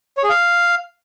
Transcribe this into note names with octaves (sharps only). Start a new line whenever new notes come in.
C#5
G#4
F5